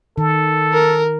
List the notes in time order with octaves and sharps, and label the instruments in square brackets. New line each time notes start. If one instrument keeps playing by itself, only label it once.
[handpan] D#3 [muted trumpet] A4
[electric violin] A#4